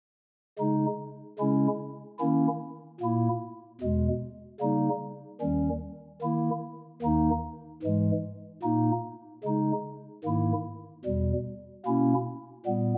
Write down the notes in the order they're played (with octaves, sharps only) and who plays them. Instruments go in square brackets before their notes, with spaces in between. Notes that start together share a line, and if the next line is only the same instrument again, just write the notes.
[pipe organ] C#3 G#3 D#4
C#3 G#3 C#4 E4
D#3 A#3 C#4 E4
A#2 A#3 E4
E2 B2 G#3
C#3 G3 A#3 D#4
D#2 D#3 G3 C#4
D#3 A#3 E4
D#2 D#3 A#3 D#4
G#2 E3 G#3
A#2 A#3 D#4
C#3 G#3 D#4
G#2 D#3 A#3 E4
E2 B2 G3
B2 A#3 C#4 E4
A#2 G3 B3